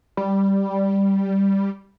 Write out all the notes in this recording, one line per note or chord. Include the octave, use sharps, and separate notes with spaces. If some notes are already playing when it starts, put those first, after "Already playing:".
G3